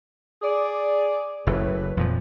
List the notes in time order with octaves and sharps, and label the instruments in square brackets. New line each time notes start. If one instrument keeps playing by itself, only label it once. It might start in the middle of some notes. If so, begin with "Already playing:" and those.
[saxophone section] G#4 D5
[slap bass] F#1 C#3 [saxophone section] A2 B4
[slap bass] F2 A#2 F3